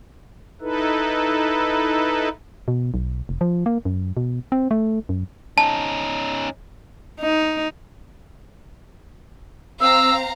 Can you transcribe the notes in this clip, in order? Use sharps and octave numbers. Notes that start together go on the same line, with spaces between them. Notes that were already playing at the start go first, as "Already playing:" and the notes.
D#4 E4 A4 B4
B2
B1
F1
F3
A#3
F#2
B2
C4
A3
F#2
C#4 D#4 A5
D#4
C4 F5 A#5 E6